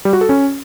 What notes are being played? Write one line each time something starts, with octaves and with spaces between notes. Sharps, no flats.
G3
F#4
A4
C#4